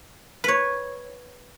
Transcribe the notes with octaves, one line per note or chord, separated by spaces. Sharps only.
B4 C#5